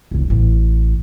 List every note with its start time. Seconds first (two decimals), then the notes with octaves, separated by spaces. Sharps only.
0.11 E1 C2
0.30 A1